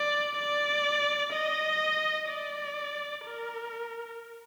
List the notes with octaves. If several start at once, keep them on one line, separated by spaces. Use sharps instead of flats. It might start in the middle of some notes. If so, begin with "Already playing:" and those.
Already playing: D5
D5
D#5
D5
A#4